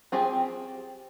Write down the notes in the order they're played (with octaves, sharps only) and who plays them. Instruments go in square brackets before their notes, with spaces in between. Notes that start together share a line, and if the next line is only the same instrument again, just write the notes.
[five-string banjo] C4 F4 G4 G#4 G#5